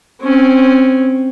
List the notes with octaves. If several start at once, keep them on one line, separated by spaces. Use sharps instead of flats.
C4 C#4